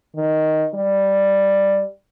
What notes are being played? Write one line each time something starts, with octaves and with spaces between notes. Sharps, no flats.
D#3
G3